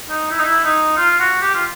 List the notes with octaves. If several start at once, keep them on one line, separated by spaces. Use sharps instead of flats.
D#4
E4
D#4
E4
D#4
F4
F#4
G4
F4